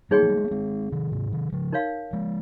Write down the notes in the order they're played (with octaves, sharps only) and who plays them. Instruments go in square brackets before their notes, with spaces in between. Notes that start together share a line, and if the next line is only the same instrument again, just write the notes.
[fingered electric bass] G3 A#3 [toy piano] D#4 G#4 C#5 G5
[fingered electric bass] F3
G3
G#3
A#3
G#3 C4
C3 D#3
G#2 C3
C3 D#3
C#3 F3
[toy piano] D#4 A#4 C#5 F5
[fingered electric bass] F3 G#3